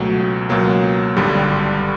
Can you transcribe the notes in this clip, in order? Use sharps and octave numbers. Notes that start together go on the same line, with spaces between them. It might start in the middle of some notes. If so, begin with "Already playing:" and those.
Already playing: C#2 B2 F#3 A3
C#2 B2 F#3 A#3
G#1 G2 D3 G3